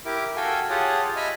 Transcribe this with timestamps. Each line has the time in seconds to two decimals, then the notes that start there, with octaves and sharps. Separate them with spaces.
0.05 E4 G4 A#4 D6
0.36 F#4 A4 F5 G5 G#5
0.70 F4 G4 G#4 C#5 F#5 A5
1.16 D#5 E5 G#5 B5 F6